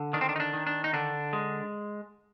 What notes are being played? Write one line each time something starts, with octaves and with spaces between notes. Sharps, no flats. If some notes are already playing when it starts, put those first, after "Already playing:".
Already playing: D3
D#3 D4
C4
D4
D#4
D4
D#3
D4
D#4
D3 D4
G#3